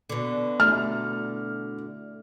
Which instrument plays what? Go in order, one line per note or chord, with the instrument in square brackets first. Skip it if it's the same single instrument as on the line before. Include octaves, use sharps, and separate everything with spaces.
[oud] B2 D3
[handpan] A3 E4 [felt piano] F6